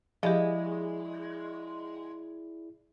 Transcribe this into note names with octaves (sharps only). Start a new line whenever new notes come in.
F3 G#3 E4 G4 G#4 D5